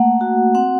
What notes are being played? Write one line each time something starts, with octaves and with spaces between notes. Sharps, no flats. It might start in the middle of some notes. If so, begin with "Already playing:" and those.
Already playing: A3 A#3 F#5
F#4
C4 F#5